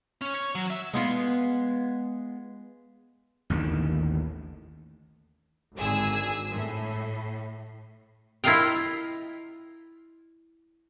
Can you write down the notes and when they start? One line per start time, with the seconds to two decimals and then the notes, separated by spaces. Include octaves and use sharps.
0.21 C#4
0.34 C#5
0.55 F#3
0.70 E5
0.93 G#3 B3 F4
3.50 A1 D#2 D3 D#3
5.77 G#1 D3 G#4 G#5 E6
6.53 A2
8.44 E4 F4 A#4 D#5 F5 G5